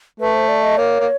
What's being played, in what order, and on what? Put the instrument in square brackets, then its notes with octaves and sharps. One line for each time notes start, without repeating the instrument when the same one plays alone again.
[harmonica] A3 [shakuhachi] B4
[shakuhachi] C5
D5
D#5
[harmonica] A#3 [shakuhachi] C#5
[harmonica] A#3